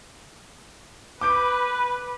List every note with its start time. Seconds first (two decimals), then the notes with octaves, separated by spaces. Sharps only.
1.21 B4 D6 G6 D7